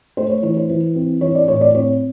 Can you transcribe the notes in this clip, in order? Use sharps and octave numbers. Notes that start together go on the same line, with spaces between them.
A3 C5
C#5
E3 C#5
C5
E3
C4
E3 C#5
D5
A2 C#5
D5
C4 C#5